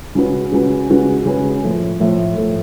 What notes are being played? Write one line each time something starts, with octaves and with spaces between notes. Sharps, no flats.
C#3 G#3 C#4 F#4 B4
C#3 G#3 C#4 F#4 B4
C#3 G#3 C#4 F#4 B4
C#3 G#3 C#4 F#4 B4
A2 F3 A3
A2 F3 A3
A2 F3 A3